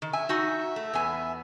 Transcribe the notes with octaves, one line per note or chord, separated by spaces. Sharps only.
D#3
E5 G#5
D#4 F#4
A3
E2 B3 G#5